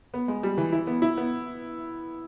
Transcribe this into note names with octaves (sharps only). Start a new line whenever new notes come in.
B3
G#3
G3
E3
E4
B3
E4
B3